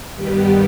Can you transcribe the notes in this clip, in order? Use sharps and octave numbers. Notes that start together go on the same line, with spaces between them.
G2 D#3 G3 B3 G4